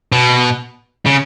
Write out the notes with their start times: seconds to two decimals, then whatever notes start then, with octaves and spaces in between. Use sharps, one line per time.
0.12 B2
1.06 C#3